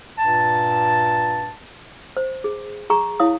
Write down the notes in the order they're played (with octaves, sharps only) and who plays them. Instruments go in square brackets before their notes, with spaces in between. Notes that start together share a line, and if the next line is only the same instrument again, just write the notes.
[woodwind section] G2 A#2 A5
[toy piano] C5
G#4
G#4 A#5 C#6
E4 C#5 F5 D#6